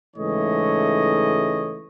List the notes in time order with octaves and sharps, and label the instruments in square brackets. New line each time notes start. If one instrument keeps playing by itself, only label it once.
[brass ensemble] C#2 G#2 E3 A3 C#5 D#5